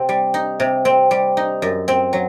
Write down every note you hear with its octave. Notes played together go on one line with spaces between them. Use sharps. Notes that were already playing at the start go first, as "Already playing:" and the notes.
Already playing: C3 C4
G3
D#4
C3
C4
G3
D#4
F#2
C4
F#3